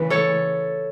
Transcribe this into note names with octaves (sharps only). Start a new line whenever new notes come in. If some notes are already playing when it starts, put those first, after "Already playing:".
Already playing: C#3 E3 A3 B4
A4 C#5